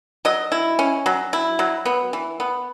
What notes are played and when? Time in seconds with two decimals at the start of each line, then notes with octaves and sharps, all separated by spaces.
0.25 F#3 D#5
0.52 E4
0.79 C#4
1.06 F#3
1.33 E4
1.59 F#3
1.85 B3
2.13 E3
2.40 B3